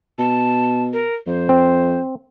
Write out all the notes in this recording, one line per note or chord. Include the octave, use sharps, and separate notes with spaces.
B2 A5
A#4
F2 C5
C4